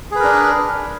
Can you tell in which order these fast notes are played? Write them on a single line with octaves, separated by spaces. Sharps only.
G#4 B4 A#4 D4